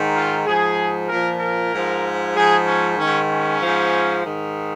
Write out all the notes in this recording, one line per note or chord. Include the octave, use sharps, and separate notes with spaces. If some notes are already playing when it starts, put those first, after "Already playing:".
Already playing: G#2 D#3
F4
G#2 F3 G#4
A#2 F3 A#4
A#4
G#2 F3
G#2 F3 G#4
C#4
G#2 D#3 C#4
C#4
G#2 F3
G#2 D#3